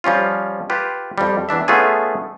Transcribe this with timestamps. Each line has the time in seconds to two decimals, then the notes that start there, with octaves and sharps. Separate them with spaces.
0.04 F3 G3 C#4 F4
0.70 F4 G4 B4
1.18 F2 G3
1.49 E2 E3 D4 E5
1.68 A3 B3 C#4 F4 G#4